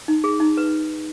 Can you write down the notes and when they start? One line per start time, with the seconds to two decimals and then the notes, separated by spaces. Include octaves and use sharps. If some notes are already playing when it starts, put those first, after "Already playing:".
0.08 D#4
0.24 G#4
0.40 D#4
0.57 B4